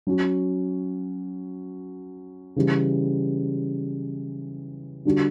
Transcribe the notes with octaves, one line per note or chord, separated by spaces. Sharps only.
F#3 C#4 F#4
C#3 E3 G3
D3 G3 D4 F#4